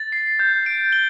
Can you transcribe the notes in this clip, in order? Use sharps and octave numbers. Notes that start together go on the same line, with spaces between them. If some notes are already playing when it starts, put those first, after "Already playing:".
Already playing: A6
C7
G6
D7
G7